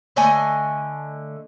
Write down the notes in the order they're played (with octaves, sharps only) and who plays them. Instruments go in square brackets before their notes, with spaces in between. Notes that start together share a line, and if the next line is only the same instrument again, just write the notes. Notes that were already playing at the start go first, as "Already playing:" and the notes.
[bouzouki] D3 A3 D#5 G#5